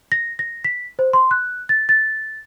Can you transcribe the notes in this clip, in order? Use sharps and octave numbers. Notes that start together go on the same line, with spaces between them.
A#6
A#6
B6
C5
C6
F#6
A6
A6